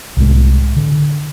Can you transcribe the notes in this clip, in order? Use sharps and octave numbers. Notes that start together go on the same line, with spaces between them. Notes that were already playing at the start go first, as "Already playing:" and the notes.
C2 A2 G#3
D3